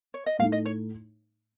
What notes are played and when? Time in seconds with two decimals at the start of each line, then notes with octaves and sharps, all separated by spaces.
0.14 C#5
0.26 D#5
0.39 A2 A3 D#4 F5
0.52 D#5
0.66 C#5